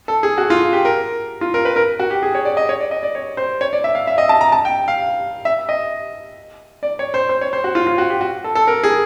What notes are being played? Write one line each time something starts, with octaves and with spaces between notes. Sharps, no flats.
A4
G#4
F#4
F4
G4
A#4
F4
A#4
B4
A#4
F#4
G4
G#4
C#5
D5
D#5
C#5
D5
D#5
D5
C#5
C5
C#5
D5
E5
F5
E5
D#5
A5
A#5
A5
G5
F5
E5
D#5
D5
C#5
C5
C5
C#5
C5
F#4
F4
F4
F#4
G4
F#4
A4
A4
A#4
G#4